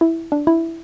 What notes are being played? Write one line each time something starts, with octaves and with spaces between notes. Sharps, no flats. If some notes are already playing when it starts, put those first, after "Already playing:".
E4
D4
E4